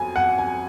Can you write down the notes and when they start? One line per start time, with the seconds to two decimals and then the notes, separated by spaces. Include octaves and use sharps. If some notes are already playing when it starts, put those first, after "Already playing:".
Already playing: F2 F#3 G#5
0.16 F#5
0.38 G#5